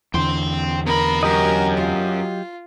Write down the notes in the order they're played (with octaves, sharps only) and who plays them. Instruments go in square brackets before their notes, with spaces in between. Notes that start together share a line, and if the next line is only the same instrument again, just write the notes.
[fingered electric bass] E2 D3 [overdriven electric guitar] G5 C6
[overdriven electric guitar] B2 B5 [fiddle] A#4
[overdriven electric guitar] F#2 [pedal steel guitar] F#3 G4 D#5 [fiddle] A#4
[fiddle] F4